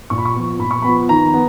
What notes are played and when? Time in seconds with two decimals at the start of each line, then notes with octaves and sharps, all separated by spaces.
0.10 A#2 C#6
0.18 B5
0.25 C#6
0.35 F3 B3
0.59 A#2 B5
0.71 C#6
0.82 F3 B3 B5
1.09 D#3 A#5
1.34 B3